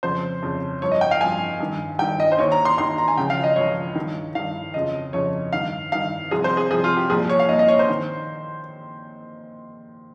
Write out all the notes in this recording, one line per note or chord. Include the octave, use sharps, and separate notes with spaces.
F2 C#3 F3 C5
F2 C#3 F3
G2 F3 C#5
D#5
G5
F5
G2 F3 G#5
G2 D#3
G2 D#3 G5
D#5
C5
D#2 D#3 C#5
A#5
C6
D#2 D#3 C6
A#5
G#5
C#2 C#3 F3 G5
F5
D#5
C#2 C#3 F3 C#5
G2 D#3
G2 D#3 F5
F2 C#3 F3 D#5
F2 C#3 F3 C#5
G2 D#3 F5
G2 D#3 F5
C2 C3 F3 G#4
C5
G#4
C2 C3 F3 G#4
F4
G4
C2 A#2 F3 G#4
C#5
F5
C2 A#2 F3 D#5
D#5
C#5
C5
D#3